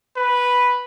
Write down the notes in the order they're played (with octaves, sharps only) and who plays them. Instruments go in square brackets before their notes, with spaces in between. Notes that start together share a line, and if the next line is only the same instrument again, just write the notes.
[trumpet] B4